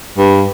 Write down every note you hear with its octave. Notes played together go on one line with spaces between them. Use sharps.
G2